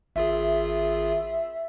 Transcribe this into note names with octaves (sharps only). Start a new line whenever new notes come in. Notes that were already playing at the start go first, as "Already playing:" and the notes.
G#1 F4 G#4 E5